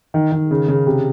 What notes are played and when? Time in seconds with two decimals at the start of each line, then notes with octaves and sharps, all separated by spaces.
0.14 D#3
0.32 D#3
0.51 C#3
0.68 C#3
0.87 C3